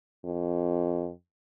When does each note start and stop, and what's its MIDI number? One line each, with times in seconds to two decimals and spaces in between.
0.25 1.11 41